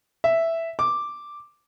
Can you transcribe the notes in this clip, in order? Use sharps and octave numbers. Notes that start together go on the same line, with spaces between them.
E5
D6